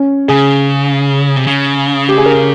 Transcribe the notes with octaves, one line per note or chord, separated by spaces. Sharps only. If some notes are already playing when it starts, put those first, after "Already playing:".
Already playing: C#4
C#3 G#4
C3
C#3
G4
G#4
A#4